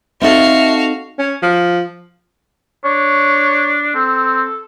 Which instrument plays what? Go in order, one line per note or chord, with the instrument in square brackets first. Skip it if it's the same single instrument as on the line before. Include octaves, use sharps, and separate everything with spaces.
[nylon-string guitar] C4 D#4 A4 [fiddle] F#4 F5 [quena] E5
[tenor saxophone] C#4
F3
[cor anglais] D4 [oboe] C#5
[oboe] C4 [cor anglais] A4